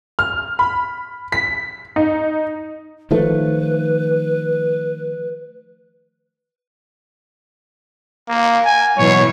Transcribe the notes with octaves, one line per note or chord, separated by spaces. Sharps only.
F6
B5
B6
D#4
D#3 F3 A3 B4
A#3
G#5
B2 E3 F#3 C#5